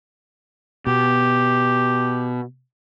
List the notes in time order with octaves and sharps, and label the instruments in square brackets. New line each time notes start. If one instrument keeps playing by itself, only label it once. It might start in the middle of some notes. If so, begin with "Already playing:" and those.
[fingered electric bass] B2 [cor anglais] G4